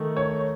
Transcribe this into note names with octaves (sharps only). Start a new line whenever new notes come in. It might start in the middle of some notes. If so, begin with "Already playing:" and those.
Already playing: D#3 A3 D#4
C#5